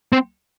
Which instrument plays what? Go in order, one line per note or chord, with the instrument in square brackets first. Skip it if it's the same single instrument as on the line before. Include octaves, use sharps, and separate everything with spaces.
[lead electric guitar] C4